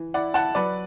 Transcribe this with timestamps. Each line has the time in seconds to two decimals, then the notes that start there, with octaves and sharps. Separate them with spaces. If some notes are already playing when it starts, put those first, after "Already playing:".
Already playing: E3
0.14 E4 D5 F#5
0.34 E4 F#5 A5
0.55 F#3 B4 D5